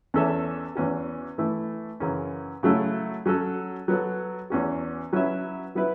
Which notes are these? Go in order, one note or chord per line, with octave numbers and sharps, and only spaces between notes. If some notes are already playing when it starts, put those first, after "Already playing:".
E2 E3 C#4 A4 E5
E2 E3 C#4 F#4
E3 A3 E4 A4
F#2 C#3 E3 C#4
C#3 F#3 A3 E4 A4
F#3 C#4 F#4 A4
F#3 B3 F#4 A4
E2 E3 C#4 F#4
F#3 C#4 E4 B4 E5
F#3 B3 E4 B4 E5